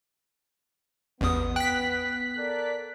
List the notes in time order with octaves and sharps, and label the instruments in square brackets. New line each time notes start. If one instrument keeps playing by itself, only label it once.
[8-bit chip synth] A1 E2 D#6 [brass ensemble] B3
[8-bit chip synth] G5 [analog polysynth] F#6 B6
[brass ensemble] A4 A#4 D5